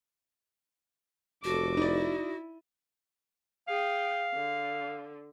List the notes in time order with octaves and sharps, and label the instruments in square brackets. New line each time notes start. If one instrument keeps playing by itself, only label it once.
[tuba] F1 [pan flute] F#4 [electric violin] A4 D6
[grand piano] D#4 D5 [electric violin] E4
[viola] G#4 G5 [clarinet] F5
[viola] D3